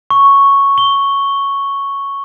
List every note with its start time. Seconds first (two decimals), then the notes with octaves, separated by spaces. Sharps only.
0.10 C#6
0.78 G7